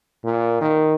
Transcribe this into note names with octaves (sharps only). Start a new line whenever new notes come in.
A#2
D#3